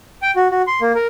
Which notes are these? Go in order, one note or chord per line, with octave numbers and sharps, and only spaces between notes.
G5
F#4
F#4
C6
A#3
A#4